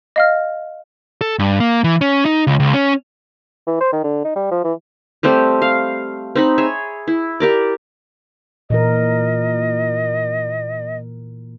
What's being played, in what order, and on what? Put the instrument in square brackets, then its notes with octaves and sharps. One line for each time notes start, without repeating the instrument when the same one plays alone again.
[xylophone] D#5 F5 F6
[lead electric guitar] A4
G2
A#3
E3
C#4
D#4
C#2
C#2
C#4
[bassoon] E3
C5
D#3
D3
D#4
G3
F3
E3
[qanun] G3 A3 C4 G4
F5
C4 D#4 B5
G#4 C#5 E5
E4
G4 A#4 D5
[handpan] A#2 E3 A#4 [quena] D#5